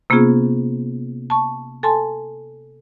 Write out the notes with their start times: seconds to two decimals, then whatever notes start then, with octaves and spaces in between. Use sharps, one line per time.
0.10 C3 A#3 B3 C#4 F4 G#4
1.30 A5 C#6
1.83 A4 G#5 A5 C6